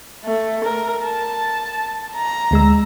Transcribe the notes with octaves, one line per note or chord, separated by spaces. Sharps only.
A3
A#4
A5
A#5
D2 G#3 E6